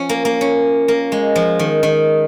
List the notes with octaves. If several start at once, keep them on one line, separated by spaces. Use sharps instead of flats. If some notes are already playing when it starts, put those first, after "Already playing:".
Already playing: F3 C#4
A#3
A#3
C#4
A#3
G#3
F3
D#3
D#3